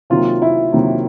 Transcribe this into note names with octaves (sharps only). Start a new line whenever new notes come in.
C3 D#3 F#3 A#3 F4
E4
C3 D#3 F#3 A#3